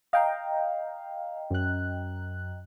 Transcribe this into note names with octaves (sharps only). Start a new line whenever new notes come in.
D#5 F5 G5 A#5
F#2 F#6